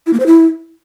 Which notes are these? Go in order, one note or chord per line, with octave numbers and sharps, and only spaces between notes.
E4
A#3
C5
E4